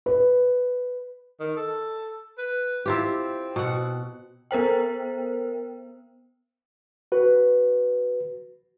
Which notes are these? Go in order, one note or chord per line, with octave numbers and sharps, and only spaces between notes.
B4
D#3
A4
B4
C4 E4 F4 G4
B2 F#5
B3 A#4 C5 G5
F#4 B4